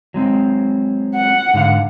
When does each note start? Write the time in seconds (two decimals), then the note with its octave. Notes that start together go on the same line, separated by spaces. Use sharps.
0.14 F#3 G#3 C4
1.16 F#5
1.54 G#2 D3 F5